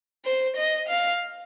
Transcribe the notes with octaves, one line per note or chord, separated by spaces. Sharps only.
C5
D#5
F5